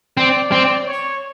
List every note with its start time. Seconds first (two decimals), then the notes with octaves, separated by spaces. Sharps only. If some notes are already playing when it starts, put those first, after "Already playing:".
0.17 C4 D5
0.52 C4
0.86 C#5